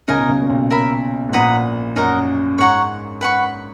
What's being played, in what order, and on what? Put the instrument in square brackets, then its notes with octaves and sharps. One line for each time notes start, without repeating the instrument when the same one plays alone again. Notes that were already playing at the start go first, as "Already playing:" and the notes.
[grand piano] C#2 C#3 [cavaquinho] D#4 A#4 D#5 G#5
[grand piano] B2
C#2 C#3
A#2
B1 B2
[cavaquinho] A#4 E5 B5
[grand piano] G#2
[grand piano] A#1 A#2 [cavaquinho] B4 F#5 A#5 D#6
[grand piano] F#2 [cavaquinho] D#4 A#4 D#5 F#5
[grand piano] G#2 [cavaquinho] C#5 F#5 A#5 C#6
[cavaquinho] B4 F#5 C#6